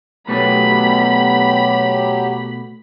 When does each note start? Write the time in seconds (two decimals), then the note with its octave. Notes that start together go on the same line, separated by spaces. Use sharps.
0.29 B2 F#3 A3 B3 G4 B5